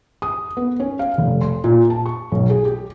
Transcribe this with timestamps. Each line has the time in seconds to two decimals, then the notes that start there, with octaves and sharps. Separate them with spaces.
0.22 D#6
0.57 B3
0.80 C#4
0.99 F5
1.18 F1
1.41 C6
1.64 A#2
1.90 A5
2.06 C#6
2.32 B1
2.50 G#4
2.65 G4